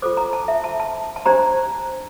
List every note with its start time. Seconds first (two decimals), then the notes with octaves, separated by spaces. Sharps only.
0.02 F4 A4 C5 D6
0.17 A#5
0.33 A5
0.48 E5
0.64 A5
0.80 A5
1.16 A5
1.26 D4 G4 C5 A#5